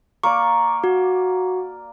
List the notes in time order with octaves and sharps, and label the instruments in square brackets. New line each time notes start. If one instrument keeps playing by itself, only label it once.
[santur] A#3 D5 [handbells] C#6
[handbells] F#4